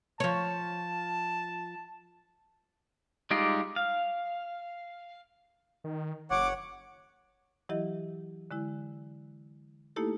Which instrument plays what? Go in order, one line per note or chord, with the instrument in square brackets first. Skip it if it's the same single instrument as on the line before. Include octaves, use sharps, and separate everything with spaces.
[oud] F3 C#5 [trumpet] A5
[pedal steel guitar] G3 G#3 D#4 F4 G4
F5
[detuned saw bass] D#3
[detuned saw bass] F#1 [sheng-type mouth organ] C#5 F#5 [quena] D6
[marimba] E3 F#3 E4 G4 D#5
D3 G#3 E4
A3 A#3 D#4 E4 G4 A4